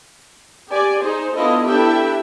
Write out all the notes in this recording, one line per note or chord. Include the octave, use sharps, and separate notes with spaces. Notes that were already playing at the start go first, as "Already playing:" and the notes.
G4 D5 G#5
D#4 G#4 C5
B3 D4 E4 F4 A4 D#5
D4 E4 G4 A4 E5 G5